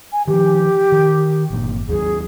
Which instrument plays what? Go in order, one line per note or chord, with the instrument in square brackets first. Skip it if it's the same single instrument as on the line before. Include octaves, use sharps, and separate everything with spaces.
[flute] G#5
[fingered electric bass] D#3 F3 [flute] G4
[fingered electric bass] D#3
G1 A#2
[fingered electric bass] D#2 F#3 [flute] G#4